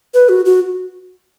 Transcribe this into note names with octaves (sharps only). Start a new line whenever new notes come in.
B4
F#4
F#4